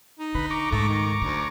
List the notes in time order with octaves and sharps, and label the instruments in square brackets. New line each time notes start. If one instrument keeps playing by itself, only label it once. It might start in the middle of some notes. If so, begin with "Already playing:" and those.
[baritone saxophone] D#4
[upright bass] D3 [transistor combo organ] B4 B5
[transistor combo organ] A#5 C#6 D6
[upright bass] C#2 G#2 [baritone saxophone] A3
[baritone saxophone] D#3
[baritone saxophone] D2 [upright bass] D3